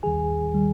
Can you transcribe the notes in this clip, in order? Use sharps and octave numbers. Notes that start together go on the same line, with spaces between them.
D#2 D#3 G3 G#4 G#5
D#3 G3